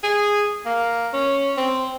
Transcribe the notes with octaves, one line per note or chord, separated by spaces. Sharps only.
G#4
A#3
C#4
C4